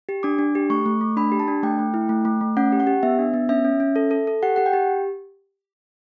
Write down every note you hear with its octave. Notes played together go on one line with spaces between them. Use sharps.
G4
D4 D6
D4
G4
A3 C#6
A3
A3
D4 B5
G4
A5
D4
A3 G5
A3
E4
A3
A3
A3
C#4 F#5
G4
F#5
G4
B3 E5
D4
B3
C#4 E5
C#4
C#4
A4
A4
A4
G4 F#5
G4 F#5
G5
G4